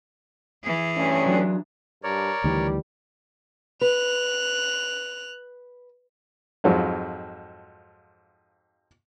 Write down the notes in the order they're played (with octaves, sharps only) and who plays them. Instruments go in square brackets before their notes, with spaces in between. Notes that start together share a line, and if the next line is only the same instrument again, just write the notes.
[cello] E3 G#4
[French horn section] G2 A3 C#4
[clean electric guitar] F#3 D4
[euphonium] G2 [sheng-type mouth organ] A#4 C#5 D5
[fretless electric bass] D2 D#3 E3 [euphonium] G3
[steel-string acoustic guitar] B4 [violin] F#6 F7
[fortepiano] F2 G#2 F3 F#3